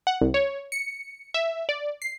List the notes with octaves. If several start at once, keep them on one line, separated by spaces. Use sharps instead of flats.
F#5
C2
C#5
C#7
E5
D5
C7